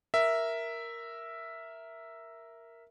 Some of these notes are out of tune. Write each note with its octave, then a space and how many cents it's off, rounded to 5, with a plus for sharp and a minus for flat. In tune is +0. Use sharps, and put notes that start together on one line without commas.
A#4 +0 E5 +0